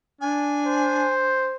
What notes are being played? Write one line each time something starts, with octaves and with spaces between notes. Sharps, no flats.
D4 G#5
C5